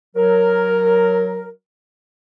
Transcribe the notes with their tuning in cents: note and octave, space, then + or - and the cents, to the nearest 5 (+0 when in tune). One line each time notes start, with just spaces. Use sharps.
F#3 +0 A#4 +0